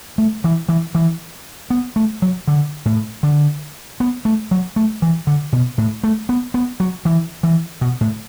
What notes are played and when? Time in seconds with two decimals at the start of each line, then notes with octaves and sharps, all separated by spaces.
0.18 A3
0.44 E3
0.69 E3
0.95 E3
1.70 B3
1.96 A3
2.22 F#3
2.47 D3
2.86 A2
3.23 D3
4.00 B3
4.25 A3
4.51 F#3
4.76 A3
5.02 E3
5.27 D3
5.53 B2
5.78 A2
6.04 A3
6.29 B3
6.54 B3
6.80 F#3
7.05 E3
7.43 E3
7.81 B2
8.01 A2